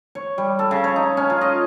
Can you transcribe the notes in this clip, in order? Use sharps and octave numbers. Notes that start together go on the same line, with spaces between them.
C#5
G3
A4
C#3
C#5
D#4
C#4
F4
D#5